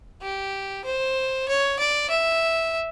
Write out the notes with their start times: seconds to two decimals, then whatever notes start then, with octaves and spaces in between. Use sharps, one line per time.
0.22 G4
0.85 C5
1.48 C#5
1.79 D5
2.10 E5